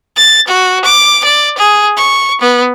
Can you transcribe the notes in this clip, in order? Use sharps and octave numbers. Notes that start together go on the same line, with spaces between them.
A6
F#4
D6
D5
G#4
C#6
B3